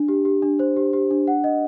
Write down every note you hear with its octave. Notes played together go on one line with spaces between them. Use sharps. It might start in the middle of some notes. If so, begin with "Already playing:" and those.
Already playing: D4
G4
G4
D4
C5
G4
G4
D4
F#5
D#5